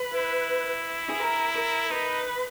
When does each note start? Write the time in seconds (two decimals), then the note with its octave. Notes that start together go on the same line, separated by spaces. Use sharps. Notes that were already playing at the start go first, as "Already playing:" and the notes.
Already playing: B4
0.14 E4
1.09 G#4
1.20 A#4
1.56 A#4
1.91 D#4 B4